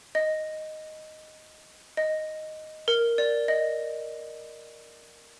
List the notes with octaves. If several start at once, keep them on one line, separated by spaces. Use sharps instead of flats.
D#5
D#5
A#4
D5
D#5